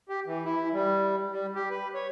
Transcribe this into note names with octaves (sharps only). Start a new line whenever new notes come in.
G4
E3
E4
G3
G3
G4
B4
C#5